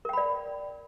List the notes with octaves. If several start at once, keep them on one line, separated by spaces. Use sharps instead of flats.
A#4 D5 G5 B5